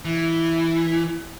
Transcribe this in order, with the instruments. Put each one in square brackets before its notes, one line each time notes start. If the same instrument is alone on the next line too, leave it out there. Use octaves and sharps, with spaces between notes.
[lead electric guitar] E3